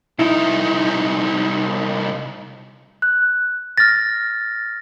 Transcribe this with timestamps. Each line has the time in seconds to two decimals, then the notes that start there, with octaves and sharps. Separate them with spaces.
0.19 C2 D#4 E4
3.02 F#6
3.78 F6 A6 A#6